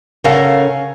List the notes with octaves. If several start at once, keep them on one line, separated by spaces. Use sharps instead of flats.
C#3 C#4 A4 A#4 F5 F#5